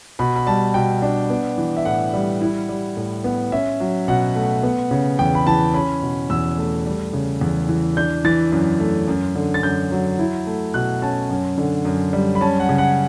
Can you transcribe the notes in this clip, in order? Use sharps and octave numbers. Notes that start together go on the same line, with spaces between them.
B2 B5
B5
G3 A5
B2 G5
D4
B3
E3
E5
A2 F#5
G3
E4
G3
A2
B3
C#4 E5
F#3
B2 F#5
A3
B3
C#3
E2 G5
B5
E3 A5
C#4 B5
B2
E2 E6
A3
G3
C#3
E2
E3
D4 G6
E3 A6
F#2
A3
F#2
D3
A6
F#2 G6
F#3
E4
A3
B2 F#6
C#4 A5
F#2
D3
F#2
G3
B5
C#4 A5
F#5
C#3
F#5